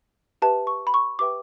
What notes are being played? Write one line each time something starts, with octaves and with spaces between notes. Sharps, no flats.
G4 B4 E5 A5
C#6
B5
C#6
G4 B4 E5 G5 D6